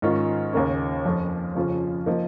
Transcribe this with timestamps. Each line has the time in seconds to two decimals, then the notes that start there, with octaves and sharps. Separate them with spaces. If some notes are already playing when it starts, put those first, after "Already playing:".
0.02 G#2 D#3 C#4 F4
0.53 D#2 C#3 A#3 C#4
1.05 F2 F3 C#4 F4
1.55 F2 C#3 F3 C#4 F4
2.06 F3 A#3 D#4